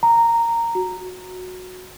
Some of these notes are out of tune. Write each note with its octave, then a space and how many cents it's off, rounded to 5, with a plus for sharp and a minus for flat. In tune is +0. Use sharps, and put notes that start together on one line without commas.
A#5 -10
F#4 -15